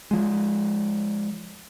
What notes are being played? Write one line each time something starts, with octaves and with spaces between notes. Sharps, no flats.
F3 G#3